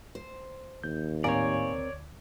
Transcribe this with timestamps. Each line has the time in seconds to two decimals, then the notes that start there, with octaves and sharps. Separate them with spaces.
0.15 C5
0.84 D#2 G6
1.24 A2 C4 A#4 C#5 D5 F5 G#5
1.72 D2